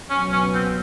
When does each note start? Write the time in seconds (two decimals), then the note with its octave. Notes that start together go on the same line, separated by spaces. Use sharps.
0.10 C#2 B2 F#3 B3 C#4
0.32 C#4
0.54 C4